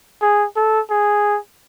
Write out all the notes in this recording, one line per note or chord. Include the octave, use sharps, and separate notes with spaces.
G#4
A4
G#4